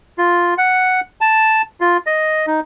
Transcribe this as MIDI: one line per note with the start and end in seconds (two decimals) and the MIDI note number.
0.18 0.54 65
0.58 1.00 78
1.21 1.62 81
1.81 1.97 65
2.06 2.46 75
2.47 2.60 63